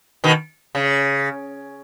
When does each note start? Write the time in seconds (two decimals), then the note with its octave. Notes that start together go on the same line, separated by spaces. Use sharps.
0.24 B2 D#3
0.75 C#3